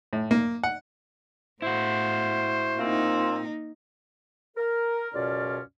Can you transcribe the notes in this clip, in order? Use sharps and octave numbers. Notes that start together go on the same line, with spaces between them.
A2
A#3
F#5
A2 E4 F#4 C5
A#2 A#3 C4 D#4 F4
A#4
C#2 F#2 B2 C#4 F4 D5